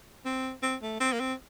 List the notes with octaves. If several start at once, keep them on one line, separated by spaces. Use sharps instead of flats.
C4
C4
A3
C4
A#3
C4